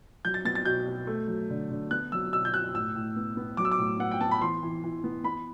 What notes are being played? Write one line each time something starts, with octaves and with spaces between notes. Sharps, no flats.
F#3 G6
A6
B3 A6
A6
B2 G6
B2
A3
F#3
D3
D3
B3 F#6
F#3 E6
B2 E6
G6
B2 F#6
A2 E6
A2
B3
B3
F#3 D6
E6
D6
A2
B3 F#5
G5
B3 A5
B5
E3 C6
E3
E3
B3
B3 B5